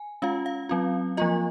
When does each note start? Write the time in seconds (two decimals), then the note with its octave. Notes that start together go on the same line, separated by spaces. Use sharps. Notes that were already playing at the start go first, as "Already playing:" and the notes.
Already playing: G#5
0.22 G#3 C#4 F4 F5
0.46 F5
0.69 F#3 C4 F4
1.17 F3 A#3 F4 D#5